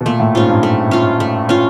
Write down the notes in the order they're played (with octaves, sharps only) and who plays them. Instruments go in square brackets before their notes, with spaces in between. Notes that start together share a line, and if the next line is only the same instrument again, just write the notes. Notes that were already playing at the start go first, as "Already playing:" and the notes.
[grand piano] B2
[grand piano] A#2 [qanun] A3
[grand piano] A2
[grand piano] G#2 [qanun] C#4 F4
[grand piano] G2
[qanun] A3
C#4 F4
A3
C#4 F4